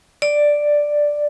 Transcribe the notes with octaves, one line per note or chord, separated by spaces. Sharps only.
D5